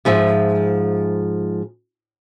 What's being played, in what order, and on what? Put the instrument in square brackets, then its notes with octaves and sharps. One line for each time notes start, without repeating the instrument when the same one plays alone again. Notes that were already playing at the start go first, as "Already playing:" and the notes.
[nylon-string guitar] G#2 F3 G#4 E5